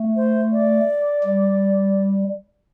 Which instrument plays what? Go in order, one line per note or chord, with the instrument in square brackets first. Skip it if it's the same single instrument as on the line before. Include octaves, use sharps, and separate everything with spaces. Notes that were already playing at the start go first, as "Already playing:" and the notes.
Already playing: [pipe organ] A3
[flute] C5
D5
[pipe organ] G3